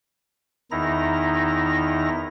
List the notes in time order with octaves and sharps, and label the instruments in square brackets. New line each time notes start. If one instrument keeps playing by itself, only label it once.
[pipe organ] E2 D#3 D#4 E4 A#5 A#6